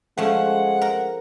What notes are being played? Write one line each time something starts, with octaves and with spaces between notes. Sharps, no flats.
F3 G#3 A3 C#4 F#5
A#4